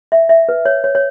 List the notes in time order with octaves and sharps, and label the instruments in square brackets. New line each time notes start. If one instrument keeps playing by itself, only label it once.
[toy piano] E5
E5
B4
C#5
C#5
C#5